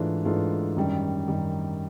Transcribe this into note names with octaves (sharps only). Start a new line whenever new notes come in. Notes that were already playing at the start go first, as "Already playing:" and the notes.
Already playing: G#2 E3 A3 D4 F4
G#2 E3 A3 D4 F4
F#2 D#3 G3
F#2 D#3 G3